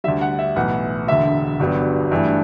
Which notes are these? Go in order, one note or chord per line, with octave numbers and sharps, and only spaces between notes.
D2 D3 G3 E5
F#5
E5
B1 A2 E3 B3 F#5
E1 D2 D3 E5
G1 G2 F#3 B3
G2 E3 A3